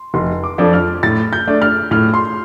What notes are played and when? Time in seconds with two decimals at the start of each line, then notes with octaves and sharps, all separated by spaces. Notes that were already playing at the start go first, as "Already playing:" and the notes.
Already playing: C6
0.14 F1 C6
0.44 D6
0.58 F2 F3 D4 A4
0.73 F6
1.03 A2 A6
1.33 G6
1.47 A3 D4
1.62 F6
1.91 A2 F6
2.14 C6